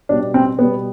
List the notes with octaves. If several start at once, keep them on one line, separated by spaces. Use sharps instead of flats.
B2 G3 D4
C4
B2 G3 B3